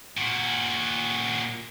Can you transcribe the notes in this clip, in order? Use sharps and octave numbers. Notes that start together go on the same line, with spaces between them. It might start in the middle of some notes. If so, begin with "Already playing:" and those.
A#2 F#4